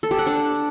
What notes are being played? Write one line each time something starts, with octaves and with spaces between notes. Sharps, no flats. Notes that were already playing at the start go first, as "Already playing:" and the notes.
A4
G4
F#5
D4